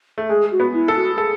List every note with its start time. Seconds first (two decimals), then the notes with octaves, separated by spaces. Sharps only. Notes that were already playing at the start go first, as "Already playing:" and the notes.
0.18 A3
0.29 G#3 G#4
0.52 F#4
0.60 B3
0.74 E4
0.88 A4
0.96 F#4
1.18 G#4 A4